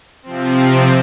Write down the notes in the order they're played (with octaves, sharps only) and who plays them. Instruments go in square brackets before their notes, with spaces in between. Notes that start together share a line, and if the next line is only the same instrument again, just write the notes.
[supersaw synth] C3 F3 C4